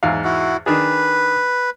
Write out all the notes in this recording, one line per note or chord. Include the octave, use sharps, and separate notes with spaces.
E2 G#2 F5
E4 F#4
D#3 D4 G#4 B4